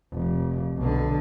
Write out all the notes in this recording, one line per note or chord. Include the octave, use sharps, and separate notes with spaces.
F1
B1 D3